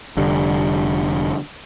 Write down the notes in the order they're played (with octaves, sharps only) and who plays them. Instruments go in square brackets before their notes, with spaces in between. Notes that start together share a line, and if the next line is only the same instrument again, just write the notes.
[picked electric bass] F1 D3 G3